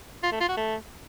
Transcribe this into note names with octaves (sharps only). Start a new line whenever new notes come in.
F4
A3
F4
F#4
A3